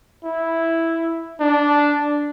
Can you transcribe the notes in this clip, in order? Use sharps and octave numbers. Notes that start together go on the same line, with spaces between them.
E4
D4